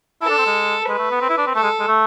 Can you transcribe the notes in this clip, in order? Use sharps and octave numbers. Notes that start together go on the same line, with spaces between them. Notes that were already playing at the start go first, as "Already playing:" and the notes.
E4 A4
D4
C4
G#3
G#3 B4
A3
B3
C4
E4
D4
C4
A3 A4
G#3
G#3
A3